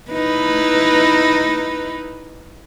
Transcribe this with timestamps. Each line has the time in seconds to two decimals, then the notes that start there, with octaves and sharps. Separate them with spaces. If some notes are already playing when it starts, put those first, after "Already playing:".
0.11 D#4 E4 B4